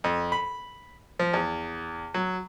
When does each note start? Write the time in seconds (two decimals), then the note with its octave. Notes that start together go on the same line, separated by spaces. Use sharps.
0.04 F2
0.32 B5
1.19 F3
1.34 E2
2.14 F#3